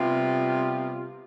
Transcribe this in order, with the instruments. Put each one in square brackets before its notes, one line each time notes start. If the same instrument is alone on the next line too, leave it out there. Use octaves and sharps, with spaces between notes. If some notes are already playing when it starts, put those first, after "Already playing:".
Already playing: [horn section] C3 G3 B3 F4